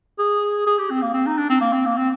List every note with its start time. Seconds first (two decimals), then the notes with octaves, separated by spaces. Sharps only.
0.19 G#4
0.67 G#4
0.79 G4
0.91 C4
1.02 A#3
1.14 C4
1.27 D#4
1.38 D4
1.50 C4
1.61 A#3
1.73 C4
1.86 A#3
1.97 C4